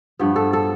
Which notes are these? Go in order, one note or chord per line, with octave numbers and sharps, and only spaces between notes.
G2 F3 B3
A4
A4